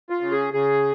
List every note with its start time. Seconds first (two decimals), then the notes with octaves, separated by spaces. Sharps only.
0.10 F4
0.21 C#3
0.32 G#4
0.53 C#3 G#4